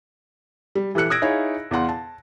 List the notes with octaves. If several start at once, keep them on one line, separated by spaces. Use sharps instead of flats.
G3
E3 G4 A4 F#6 C#7
D#6 E6 F#6 G#6 A#6 D7
D#4 E4 G#4 C#5 F5
E2 F5 F#5 C6
A5